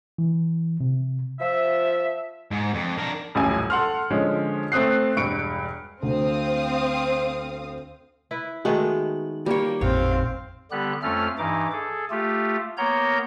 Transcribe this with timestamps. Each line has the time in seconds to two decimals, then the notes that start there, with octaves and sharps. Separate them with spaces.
0.18 E3
0.80 C3
1.40 F3 E5
2.51 G#2
2.74 F2
2.98 D4 A#4
3.35 D#1 A1 F#2 G#5
3.70 A4 F#5 C6 F6
4.10 D3 F3 G#3 C#4
4.72 A3 C4 D#6 F#6 C7
5.16 E1 G2 C#6 C#7 D7
6.03 D2 C4 F5 D#6
8.31 E4 B4
8.65 D#3 G#3 A3 B3 F#4
9.46 G3 A#3 C#5
9.81 A1 F2 A#2 C4 C#5 F5
10.71 D3 G3 B3 G4 F#6
11.02 F2 A3 C#4 F4 A4 F6
11.38 G2 E3 D#4 D6
11.72 G#4 A4
12.11 A3 F4 G4
12.78 A#3 B3 A#4 C#5 A#5 G6